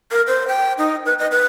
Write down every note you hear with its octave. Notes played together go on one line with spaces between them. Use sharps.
A#4
C5
G5
D#4
B4
D#5
B4